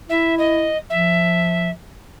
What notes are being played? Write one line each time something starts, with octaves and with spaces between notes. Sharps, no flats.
E4 E5
D#5
F3 E5